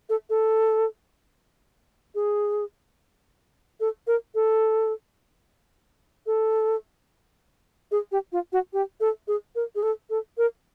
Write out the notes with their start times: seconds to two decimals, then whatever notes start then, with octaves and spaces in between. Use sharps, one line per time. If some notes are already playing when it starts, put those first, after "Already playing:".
0.09 A4
0.30 A4
2.15 G#4
3.80 A4
4.07 A#4
4.35 A4
6.26 A4
7.91 G#4
8.12 G4
8.32 F4
8.53 F#4
8.73 G4
9.00 A4
9.28 G#4
9.55 A#4
9.75 G#4
9.83 A4
10.10 A4
10.38 A#4